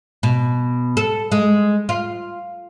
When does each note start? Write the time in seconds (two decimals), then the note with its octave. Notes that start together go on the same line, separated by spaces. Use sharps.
0.23 B2
0.97 A4
1.32 G#3
1.89 F4